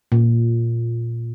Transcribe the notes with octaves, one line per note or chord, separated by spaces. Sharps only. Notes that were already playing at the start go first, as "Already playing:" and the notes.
A#2